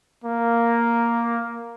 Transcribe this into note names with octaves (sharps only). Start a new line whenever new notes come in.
A#3